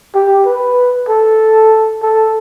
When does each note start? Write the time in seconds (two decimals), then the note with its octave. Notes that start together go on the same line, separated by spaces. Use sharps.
0.15 G4
0.46 B4
1.08 A4
2.02 A4